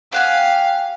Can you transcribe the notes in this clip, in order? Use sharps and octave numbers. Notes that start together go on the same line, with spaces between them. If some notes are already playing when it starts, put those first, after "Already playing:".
G4 F5 F#5 G#5